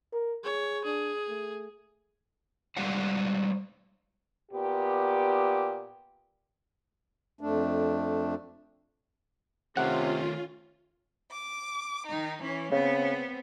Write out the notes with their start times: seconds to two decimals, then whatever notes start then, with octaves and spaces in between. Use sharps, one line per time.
0.13 A#4
0.44 G#4 C#5
0.85 D4 G#4
1.28 A3
2.77 G3 G#3 C5 D5 F5 F#5
4.52 A#2 B3 G4
7.41 F2 A3 D4
9.77 C3 D#3 A3 C#4 F4 F#5
11.30 D6
12.06 D#3 D#4
12.42 E3 C#4
12.72 C#3 B3 C4